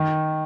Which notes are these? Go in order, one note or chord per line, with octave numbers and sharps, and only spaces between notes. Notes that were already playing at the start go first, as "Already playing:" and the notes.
Already playing: D#3